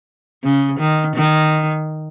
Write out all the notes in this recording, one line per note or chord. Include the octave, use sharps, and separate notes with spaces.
C#3
D#3
D#3